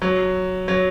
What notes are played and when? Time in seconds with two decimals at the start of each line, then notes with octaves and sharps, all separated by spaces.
0.02 F#3
0.68 F#3